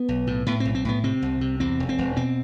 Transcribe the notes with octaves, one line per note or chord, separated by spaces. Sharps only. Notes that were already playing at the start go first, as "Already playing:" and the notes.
Already playing: B3
B1
A2
A2 B3
B1 C4
C4
A2 B3
C3 C4
C2
C3
E2 C4
E1
C4
E1
B2 C4